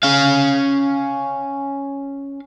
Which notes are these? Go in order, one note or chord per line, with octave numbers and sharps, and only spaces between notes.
C#4 F5